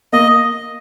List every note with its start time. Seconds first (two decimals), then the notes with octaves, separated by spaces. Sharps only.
0.13 A#3 D#5